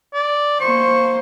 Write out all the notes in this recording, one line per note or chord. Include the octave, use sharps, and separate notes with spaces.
D5
A#3 C5 C#6